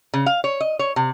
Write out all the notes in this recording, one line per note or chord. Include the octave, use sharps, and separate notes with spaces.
C#3
F5
C#5
D#5
C#5
C3